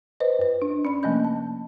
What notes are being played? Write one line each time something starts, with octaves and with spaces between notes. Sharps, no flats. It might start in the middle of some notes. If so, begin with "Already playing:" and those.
B4 C5 D#5
F#2 B4
D4
C#4 D5 B5
C3 F3 A3 A#3 D#5 G6
A5